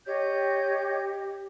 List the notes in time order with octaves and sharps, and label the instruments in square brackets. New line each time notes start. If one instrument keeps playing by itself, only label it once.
[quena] G4 [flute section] C#5 D#5 G6